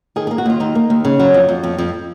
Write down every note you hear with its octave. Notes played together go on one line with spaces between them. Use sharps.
D#3 G#4
G#4
A#3
F#4
D#2 F4
D#2 D#4
A#3
D#2
C#3
F#3
F2
F2
F2
F2